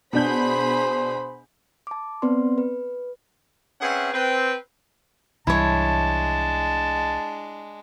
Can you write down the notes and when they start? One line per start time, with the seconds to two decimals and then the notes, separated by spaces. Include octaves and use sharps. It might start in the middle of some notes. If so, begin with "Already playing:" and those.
0.13 B2 D4 G#4 C5 B5 G6
1.87 A5 D6
2.22 B3 C4 B4 D5 C6
2.58 B4
3.81 C4 C#4 G#4 B4 E5 F#5
4.13 C4 B4 G5
5.47 C2 E3 G3 G#3 D4 E4 C#5 A5